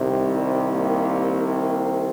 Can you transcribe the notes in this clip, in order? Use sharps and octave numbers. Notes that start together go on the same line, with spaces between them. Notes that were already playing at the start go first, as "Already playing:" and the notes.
Already playing: C2 C3 D#3
G3
A#3
A#3